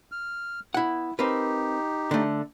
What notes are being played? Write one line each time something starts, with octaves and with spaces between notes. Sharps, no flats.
F6
B3 E4 F#5
C4 D#4 G4 A#4 B4
D3 A3